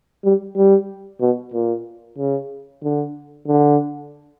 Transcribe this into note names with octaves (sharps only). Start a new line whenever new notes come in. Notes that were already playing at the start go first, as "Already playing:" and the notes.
G3
G3
B2
A#2
C#3
D3
D3